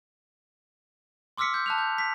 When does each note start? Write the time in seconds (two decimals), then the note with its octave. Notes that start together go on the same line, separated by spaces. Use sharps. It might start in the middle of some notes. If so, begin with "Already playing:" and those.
1.38 C6 D6 E6 F6 B6 C#7
1.54 G6
1.66 A5 F#6 F7
1.78 G6
1.98 B6